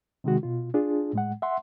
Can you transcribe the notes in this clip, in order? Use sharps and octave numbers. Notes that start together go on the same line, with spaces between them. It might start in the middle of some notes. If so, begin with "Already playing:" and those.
C3 D#3 G#3 F#4
B2 F4
D4 F4 G#4
A2 G#3 F#5
E5 F#5 C6